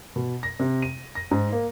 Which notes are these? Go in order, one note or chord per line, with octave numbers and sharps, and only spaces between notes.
B2
A#6
C3
D#7
A#6
G#2
A#3